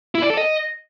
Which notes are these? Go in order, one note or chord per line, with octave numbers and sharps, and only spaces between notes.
E4
D5
A4
D#5